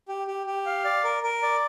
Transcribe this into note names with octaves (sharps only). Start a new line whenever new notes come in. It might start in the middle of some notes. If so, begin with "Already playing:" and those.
G4
G4
G4
F5
D5
A#4
A#4
D5